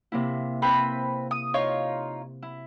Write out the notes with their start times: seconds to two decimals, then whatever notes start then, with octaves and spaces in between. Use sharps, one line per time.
0.12 C3 A#3 E4
0.62 C4 B4 B5
1.31 D#6
1.54 D#4 F4 C#5
2.42 E4